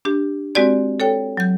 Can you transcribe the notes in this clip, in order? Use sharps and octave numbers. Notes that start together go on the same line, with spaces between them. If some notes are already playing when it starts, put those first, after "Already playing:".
D4 G4
G#3 C4 F#4 G4 D5 C6
A4 C#5 G5
F#3 G6